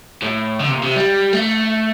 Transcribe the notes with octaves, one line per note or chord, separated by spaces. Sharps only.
A2
D3
C3
A#2
C3
G3
A3